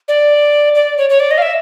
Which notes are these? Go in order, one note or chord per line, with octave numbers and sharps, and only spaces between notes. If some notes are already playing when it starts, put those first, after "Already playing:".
D5
D5
C#5
C#5
D5
D#5
F5
E5